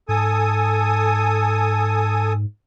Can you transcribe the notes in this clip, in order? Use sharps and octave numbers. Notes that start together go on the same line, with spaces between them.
G#2 A4 G#5 D#6